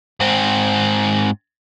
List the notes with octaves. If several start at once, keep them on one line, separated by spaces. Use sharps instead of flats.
G#2 C4